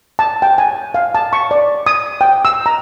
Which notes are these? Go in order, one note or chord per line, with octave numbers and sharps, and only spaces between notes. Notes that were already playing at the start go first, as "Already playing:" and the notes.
A5
G5
G#5
F5
A5
C#6
D5
D#6
G5
E6
A#5